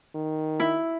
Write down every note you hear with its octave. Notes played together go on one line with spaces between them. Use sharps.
D#3
E4